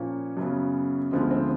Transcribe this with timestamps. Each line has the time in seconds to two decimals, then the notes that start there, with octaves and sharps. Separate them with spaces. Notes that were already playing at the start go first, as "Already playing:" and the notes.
Already playing: A#2 F3 A#3 C#4
0.37 F#2 C#3 F#3 B3
1.12 D2 D3 F3 G#3 B3
1.31 C4